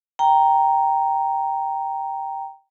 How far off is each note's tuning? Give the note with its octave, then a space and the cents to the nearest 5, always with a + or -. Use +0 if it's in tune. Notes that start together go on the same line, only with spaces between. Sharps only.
G5 +0 A#5 +0